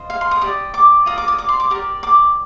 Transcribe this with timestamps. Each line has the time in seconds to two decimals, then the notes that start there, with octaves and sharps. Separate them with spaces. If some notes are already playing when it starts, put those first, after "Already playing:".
Already playing: F4 C5 D#5
0.10 F5
0.21 C6
0.31 D#6
0.41 G4 D5 D#6
0.74 D6
1.06 F4 A#4 D5 D#6
1.18 D6
1.28 D#6
1.38 D6
1.49 C6
1.60 D6
1.70 G4 A#4 D5 D#6
2.03 D6